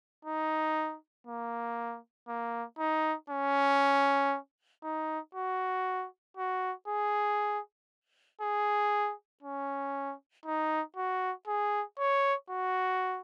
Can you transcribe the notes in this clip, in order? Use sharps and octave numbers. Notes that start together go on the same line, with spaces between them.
D#4
A#3
A#3
D#4
C#4
D#4
F#4
F#4
G#4
G#4
C#4
D#4
F#4
G#4
C#5
F#4